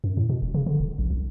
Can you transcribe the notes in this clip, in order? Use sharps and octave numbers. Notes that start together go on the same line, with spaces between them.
F#2
A2
B2
E1
C#3
D3
E1
A#1
C2